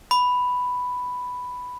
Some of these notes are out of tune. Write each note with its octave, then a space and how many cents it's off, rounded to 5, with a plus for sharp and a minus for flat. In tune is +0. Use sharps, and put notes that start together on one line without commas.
B5 +5